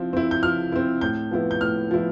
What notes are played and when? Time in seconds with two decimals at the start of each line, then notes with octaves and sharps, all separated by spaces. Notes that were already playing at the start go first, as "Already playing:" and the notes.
Already playing: F3 C4 E4
0.13 C4 E4
0.31 G6
0.43 F3 F6
0.72 C4 E4
1.01 A2 G6
1.31 F3 B3 E4
1.51 G6
1.61 A2 F6
1.91 F3 B3 E4